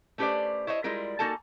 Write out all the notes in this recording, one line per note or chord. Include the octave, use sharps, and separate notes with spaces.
A3 C#4 G4 B4 C5 D5
E4 C5 C#5 D#5
G3 G#3 E4 F4 A#4
A#3 D#4 F#4 A4 G#5 A5